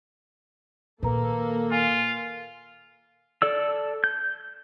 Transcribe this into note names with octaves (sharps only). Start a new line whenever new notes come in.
A#2 D#3 A#3 A4 B4 A#5
F4 F5 G#5
A4 D5 E6
G6